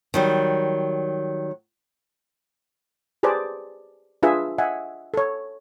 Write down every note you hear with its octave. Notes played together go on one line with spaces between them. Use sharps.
D#3 F#3 G3
G4 G#4 B4 C5 D5 A5
D4 F4 G#4 B4 E5
D#5 E5 F#5 G#5
A4 C#5